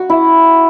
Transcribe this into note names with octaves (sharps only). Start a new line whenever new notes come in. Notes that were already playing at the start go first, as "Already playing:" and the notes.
Already playing: F#4
E4